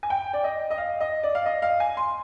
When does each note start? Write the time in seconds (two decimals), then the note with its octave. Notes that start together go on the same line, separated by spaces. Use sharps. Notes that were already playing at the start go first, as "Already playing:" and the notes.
0.03 G#5
0.10 G5
0.33 D5
0.44 D#5
0.70 D#5
0.78 F5
1.00 D#5
1.23 D5
1.35 F5
1.46 D#5
1.62 F5
1.80 G#5
1.97 C6